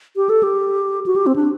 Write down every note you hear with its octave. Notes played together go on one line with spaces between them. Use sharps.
G4
A4
G4
F#4
G4
C4
D4